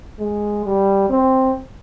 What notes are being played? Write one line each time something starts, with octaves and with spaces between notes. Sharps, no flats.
G#3
G3
C4